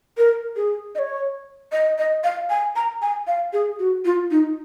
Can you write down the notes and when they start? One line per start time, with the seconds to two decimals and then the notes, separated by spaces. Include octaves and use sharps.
0.18 A#4
0.56 G#4
0.95 D#5
0.99 C#5
1.72 D#5
1.98 D#5
2.24 F5
2.50 G#5
2.76 A#5
3.02 G#5
3.27 F5
3.53 G#4
3.79 F#4
4.05 F4
4.31 D#4